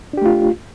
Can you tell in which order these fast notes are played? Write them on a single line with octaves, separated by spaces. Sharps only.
D4 G4 A3 F4